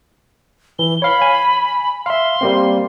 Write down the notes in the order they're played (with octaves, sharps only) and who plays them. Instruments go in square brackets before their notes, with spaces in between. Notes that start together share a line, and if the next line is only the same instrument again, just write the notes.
[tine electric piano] E3 [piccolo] G7
[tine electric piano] C#5 F5 [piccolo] B5
[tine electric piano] G#5
[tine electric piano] E5 F5 [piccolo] C6
[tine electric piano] G3 A#3 C4